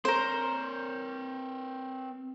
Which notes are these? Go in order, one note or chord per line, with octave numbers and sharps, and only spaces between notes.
C4 A#4 C5 C#5